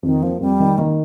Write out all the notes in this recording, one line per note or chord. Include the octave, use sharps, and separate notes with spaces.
F2 D#3
F3 A#3
F2 G3
D#3
D#3 A#3